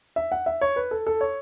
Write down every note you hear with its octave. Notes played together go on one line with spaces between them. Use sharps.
E5
F#5
E5
C#5
B4
A4
A4
C#5